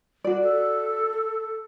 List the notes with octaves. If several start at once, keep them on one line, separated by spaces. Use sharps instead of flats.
F#4 D5
A4